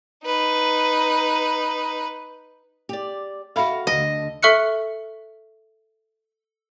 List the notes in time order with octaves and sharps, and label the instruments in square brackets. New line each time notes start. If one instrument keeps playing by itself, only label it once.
[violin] D#4 B4
[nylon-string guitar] G4 D5
[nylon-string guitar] F#4 F5 [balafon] A4 E5 B5
[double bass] D2 D3 [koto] D#5
[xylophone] A4 E5 C#6 F6 F#6 C#7